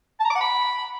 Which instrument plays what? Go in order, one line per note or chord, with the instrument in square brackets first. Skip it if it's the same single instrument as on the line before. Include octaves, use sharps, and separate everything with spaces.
[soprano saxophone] A5
A#5
D6
F#5
B5